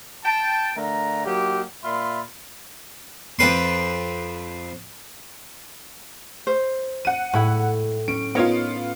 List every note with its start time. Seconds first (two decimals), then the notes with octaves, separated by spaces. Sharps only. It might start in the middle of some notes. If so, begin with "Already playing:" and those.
0.24 G5 A5
0.77 D3 A3 A#4 A#5
1.26 F#3 A#3 D#4 G4
1.84 A#2 F4 E5 B5 C6
3.39 F2 C4 B4 C6
6.47 C5
7.05 F#5 D#7
7.33 A2 E4 B5
8.08 C#4 D7
8.35 B3 D#4 F4 A#4 C#5